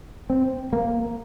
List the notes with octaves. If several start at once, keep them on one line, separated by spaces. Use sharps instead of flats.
C4
A#3